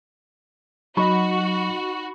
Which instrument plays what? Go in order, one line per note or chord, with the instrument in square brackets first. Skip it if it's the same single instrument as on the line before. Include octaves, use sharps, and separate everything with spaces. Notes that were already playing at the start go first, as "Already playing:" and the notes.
[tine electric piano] F#3 [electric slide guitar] D#4 D#5 [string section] F#4 [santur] B5 C#6